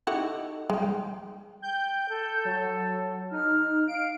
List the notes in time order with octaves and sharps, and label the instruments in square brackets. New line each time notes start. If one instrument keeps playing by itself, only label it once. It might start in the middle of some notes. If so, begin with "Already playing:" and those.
[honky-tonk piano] D#4 A4 [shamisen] E4 F#4 G4
[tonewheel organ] G3 G5 [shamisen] G#3
[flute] G5 [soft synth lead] G6
[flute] A4
[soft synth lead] F#3
[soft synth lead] D#4 [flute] F6
[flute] F5 [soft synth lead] D7